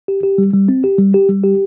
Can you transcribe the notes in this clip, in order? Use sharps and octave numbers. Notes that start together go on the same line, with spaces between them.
G4
G4
G3
G3
C4
G4
G3
G4
G3
G4